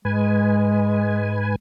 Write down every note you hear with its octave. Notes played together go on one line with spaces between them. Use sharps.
G#2 G#3 B4 G#5